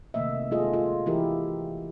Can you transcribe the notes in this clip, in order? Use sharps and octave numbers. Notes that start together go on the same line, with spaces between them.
C3 D#3 A3 A#3 D#5 E5
G#3 A#3 F4 G#4 A4 D#5
F4
E3 E4 G4 A#4